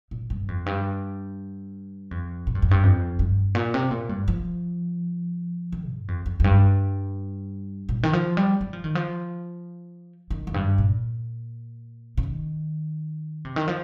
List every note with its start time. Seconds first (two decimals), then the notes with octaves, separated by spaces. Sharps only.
0.11 A#2
0.30 G2
0.48 F2
0.66 G2
2.11 F2
2.47 A#2
2.55 G2
2.62 F2
2.71 G2
2.83 F2
3.19 G2
3.55 A#2
3.74 C3
3.91 A#2
4.09 G2
4.28 F3
5.72 D#3
5.90 G2
6.08 F2
6.26 F2
6.40 F2
6.44 G2
7.89 A#2
8.03 D#3
8.13 F3
8.37 G3
8.61 G3
8.73 F3
8.84 D#3
8.95 F3
10.30 D#3
10.47 F2
10.54 G2
10.78 A#2
12.17 C3
12.23 D#3
13.45 C3
13.56 D#3
13.68 F3